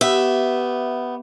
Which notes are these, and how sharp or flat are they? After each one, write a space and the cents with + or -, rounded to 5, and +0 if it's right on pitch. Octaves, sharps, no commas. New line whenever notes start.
B3 +0 G4 -20 E5 +0